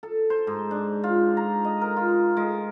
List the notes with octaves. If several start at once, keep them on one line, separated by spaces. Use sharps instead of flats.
A4
C5
G#2
D4
F4
A#5
D#5
A#4
F4
G#3